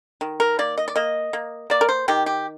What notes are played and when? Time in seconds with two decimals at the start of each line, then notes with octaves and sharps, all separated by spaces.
0.21 D#3
0.40 A#4
0.59 A#3 D5
0.78 D#5
0.88 D5
0.96 A#3 D#5
1.33 A#3
1.70 A#3 D5
1.81 A#4
1.89 C5
2.08 D#3 G4
2.26 G4